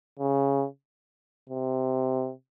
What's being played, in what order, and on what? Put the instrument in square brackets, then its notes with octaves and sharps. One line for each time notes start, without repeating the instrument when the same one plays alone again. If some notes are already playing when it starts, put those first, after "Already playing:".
[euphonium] C#3
C3